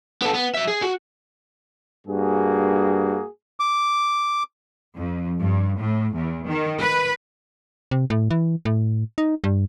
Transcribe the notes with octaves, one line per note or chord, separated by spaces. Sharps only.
B3 A4
B3
F#3 E5
G#4
F#4
G2 A#3 F#4 G#4
D6
F2
G2
A2
E2
D#3
B4
C3
A2
E3
A2
D#4
G2